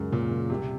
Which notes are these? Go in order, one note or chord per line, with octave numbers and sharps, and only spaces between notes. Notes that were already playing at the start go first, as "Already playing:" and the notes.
Already playing: C#2 F#2 G#3 A#4
A#2 C#3
C#2
C2 C3